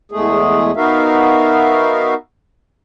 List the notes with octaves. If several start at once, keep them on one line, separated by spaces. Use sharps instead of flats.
E2 G#3 A3 G#4
B3 D#4 F#4 A#4 E5 F5